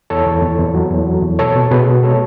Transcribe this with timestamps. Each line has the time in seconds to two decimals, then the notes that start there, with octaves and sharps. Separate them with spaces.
0.10 E2 A4 C#5
0.27 E2
0.43 E2
0.59 E2
0.75 F#3
0.91 E2
1.07 F#3
1.23 E2
1.39 B2 A4 C#5
1.55 B2
1.71 B2 G#4 B4
1.88 B2
2.03 G#3 A4 C#5